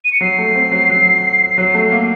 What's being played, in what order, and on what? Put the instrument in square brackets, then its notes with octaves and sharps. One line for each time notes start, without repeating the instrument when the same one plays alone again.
[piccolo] D#7
C#7
[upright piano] F#3 [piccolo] C7
[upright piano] A3
C4
F#3
F#3
F#3
A3
A#3